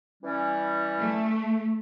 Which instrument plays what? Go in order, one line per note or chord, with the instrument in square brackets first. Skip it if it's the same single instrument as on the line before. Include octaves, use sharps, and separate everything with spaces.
[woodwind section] E3 G3 C#4
[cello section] A3